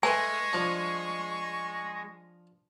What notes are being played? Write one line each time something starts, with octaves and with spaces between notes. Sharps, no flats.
G#3 A3 B4 G#5 C6 C#6
F3 D4